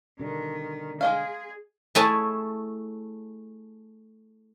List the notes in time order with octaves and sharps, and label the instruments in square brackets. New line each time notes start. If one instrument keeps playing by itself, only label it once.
[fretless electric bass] B2 D3 G3 [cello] D#3
[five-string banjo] G#3 D#5 F5 [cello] G#4
[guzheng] A3 E4 G#4 C#5 G#5 A5